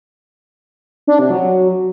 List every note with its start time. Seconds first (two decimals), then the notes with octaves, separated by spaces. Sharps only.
1.07 D4
1.19 C3
1.30 F#3